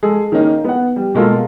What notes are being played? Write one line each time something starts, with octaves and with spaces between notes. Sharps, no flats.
G#3 G#4 A4
D#3 A#3 C#4 D#4
B3 F#5
G3
B2 G#3 A#3 F4 A4